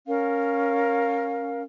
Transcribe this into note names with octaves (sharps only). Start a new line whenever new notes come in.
C#4 A#4 F5